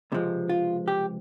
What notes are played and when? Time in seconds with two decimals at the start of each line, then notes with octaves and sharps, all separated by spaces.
0.12 C#2 C3 F3 G#3
0.49 F4
0.88 G4